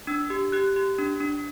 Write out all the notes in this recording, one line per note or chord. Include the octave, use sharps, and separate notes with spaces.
D4 E6
G4
G4 F#6
G4
D4
D4